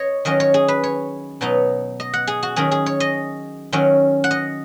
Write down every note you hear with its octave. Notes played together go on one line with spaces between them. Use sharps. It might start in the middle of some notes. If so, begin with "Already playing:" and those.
Already playing: C#5 D#5
D#3 F#3 C#4 D#5
C#5
G#4
B4
C#5
B2 F#3 B3 D#4
D#5
F#5
G#4
F#4
D#3 F#3 C#4 G#4
G#4
C#5
D#5
D#3 F#3 C#4
F#5
D#5